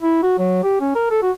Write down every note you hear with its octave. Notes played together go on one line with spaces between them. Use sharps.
E4
F#4
F#3
G4
C#4
A#4
A4
F#4